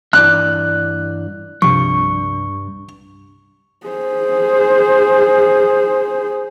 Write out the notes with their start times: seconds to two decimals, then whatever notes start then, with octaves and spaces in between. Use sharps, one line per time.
0.13 G2 E3 D5 F#6
1.62 C2 G2 C3 F3 C#6
3.87 G#4 C5